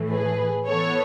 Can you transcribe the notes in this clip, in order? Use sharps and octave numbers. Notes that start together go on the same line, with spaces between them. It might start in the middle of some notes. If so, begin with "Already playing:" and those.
Already playing: A2 E3 A3
G#4 B4
E3 B3 A4 C#5